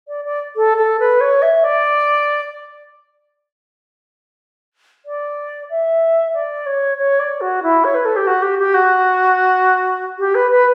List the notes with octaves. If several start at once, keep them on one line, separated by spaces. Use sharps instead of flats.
D5
D5
A4
A4
B4
C#5
E5
D5
D5
E5
D5
C#5
C#5
D5
F#4
E4
C#5
B4
A4
G4
F#4
G4
G4
F#4
G4
B4
B4